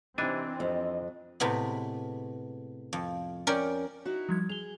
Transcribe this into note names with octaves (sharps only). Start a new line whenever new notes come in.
C3 E3 C4 D4 D#4 G#5
F2 D#5
A2 C3 G#3 B3
F2
C#4 A#4 D5 G5
D#4 E4 F#4
F3 G3 G#6
G#4 F7 G7